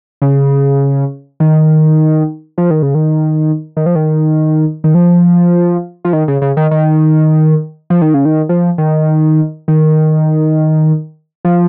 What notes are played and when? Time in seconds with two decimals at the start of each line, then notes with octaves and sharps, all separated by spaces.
0.22 C#3
1.40 D#3
2.58 F3
2.71 D#3
2.82 C#3
2.95 D#3
3.77 D#3
3.86 F3
3.95 D#3
4.84 D#3
4.94 F3
6.05 F3
6.13 D#3
6.28 C#3
6.42 C#3
6.57 D#3
6.71 D#3
7.90 F3
8.02 D#3
8.14 C#3
8.25 D#3
8.49 F3
8.78 D#3
9.68 D#3
11.45 F3